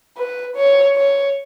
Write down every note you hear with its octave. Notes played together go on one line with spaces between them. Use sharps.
B4
C#5
C#5